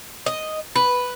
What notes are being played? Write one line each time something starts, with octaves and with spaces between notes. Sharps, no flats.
D#5
B4